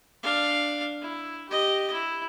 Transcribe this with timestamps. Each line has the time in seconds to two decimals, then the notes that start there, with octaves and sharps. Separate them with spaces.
0.23 D4 F5
1.01 E4
1.49 G4 D#5
1.93 E4